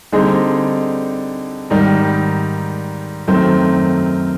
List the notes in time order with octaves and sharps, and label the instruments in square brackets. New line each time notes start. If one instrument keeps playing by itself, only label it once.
[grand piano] D3 G3 C4 D#4 G#4
G#2 D#3 G3
F#2 D#3 F#3 A3 C4